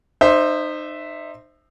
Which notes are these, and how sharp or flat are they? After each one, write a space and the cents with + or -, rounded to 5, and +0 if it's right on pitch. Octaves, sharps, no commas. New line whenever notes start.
D#4 -30 C5 +0 E5 +0